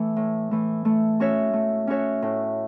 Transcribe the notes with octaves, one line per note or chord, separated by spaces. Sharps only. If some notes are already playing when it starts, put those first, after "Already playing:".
Already playing: E3 A3
A2
E3 A3
A3
C#4 F#4 C#5 E5
A3
C#4 F#4 C#5 E5
A2